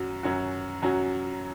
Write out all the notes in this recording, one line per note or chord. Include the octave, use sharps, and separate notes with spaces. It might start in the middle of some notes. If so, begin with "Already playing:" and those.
Already playing: F#2 F#3 C#4 F#4
F#2 F#3 C#4 F#4
F#2 F#3 C#4 F#4